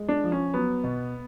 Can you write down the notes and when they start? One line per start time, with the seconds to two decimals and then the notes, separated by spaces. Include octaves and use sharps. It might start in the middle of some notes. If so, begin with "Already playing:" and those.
Already playing: G#3
0.09 D4
0.24 F3
0.32 C#4
0.54 F#3 B3
0.84 B2